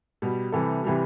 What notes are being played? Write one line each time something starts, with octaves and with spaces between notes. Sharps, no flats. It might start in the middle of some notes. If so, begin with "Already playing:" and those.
B2 G3
C3 E3 G3 A4
C3 E3 G3